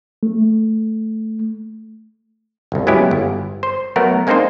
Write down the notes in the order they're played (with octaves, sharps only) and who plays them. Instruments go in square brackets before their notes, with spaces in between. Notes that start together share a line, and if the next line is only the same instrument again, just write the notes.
[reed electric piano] A3
[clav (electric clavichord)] G1 C2
F#3 G#3 B3 C#4 E4 G4
G1
C5
F#3 A3 B3 F#4 A#4
G#3 A#3 C4 D4 D#4 C5